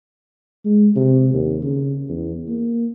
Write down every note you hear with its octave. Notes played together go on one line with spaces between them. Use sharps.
G#3
C3
D#2
C#3
E2
A#3